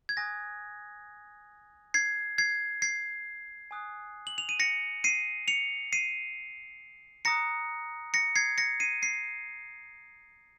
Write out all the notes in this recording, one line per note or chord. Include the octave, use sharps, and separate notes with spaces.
G#6
G#5 D#6 F#6 A#6
G#6 C7
G#6 C7
G#6 C7
G#5 D#6 F#6
F#7
F7
D#7
A#6 C#7
C7 D#7
C#7 F7
C7 D#7
A#5 D#6 F#6 A#6 C#7
A#6 C#7
G#6 C7
A#6 C#7
C7 D#7
C7 D#7